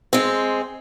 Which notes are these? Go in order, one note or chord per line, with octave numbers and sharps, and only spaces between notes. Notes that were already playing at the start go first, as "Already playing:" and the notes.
G#3 C4